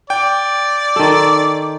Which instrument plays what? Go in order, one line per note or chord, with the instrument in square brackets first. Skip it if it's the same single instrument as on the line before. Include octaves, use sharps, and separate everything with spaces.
[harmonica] D5 [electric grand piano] G5
[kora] D#3 A4